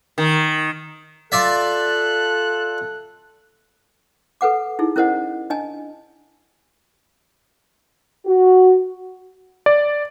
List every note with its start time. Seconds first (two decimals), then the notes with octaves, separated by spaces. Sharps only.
0.18 D#3
1.32 F4 A4 D5 E5 F#6
4.41 A4 B4 F#5 D6
4.79 D#4 E4 G#4
4.96 C#4 E4 A#4 C5 D#5 F#5
5.50 D4 D#5 G#5 A5
8.26 F#4
9.66 D5